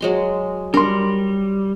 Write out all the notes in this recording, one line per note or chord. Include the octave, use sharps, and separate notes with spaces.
F#3 G#3 C6
G3 D4 A#4 C6